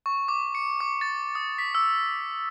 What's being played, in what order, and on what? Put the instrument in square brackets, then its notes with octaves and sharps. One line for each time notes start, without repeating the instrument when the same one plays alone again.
[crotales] C#6
D6
C#7
D6
A6
D#6
B6
E6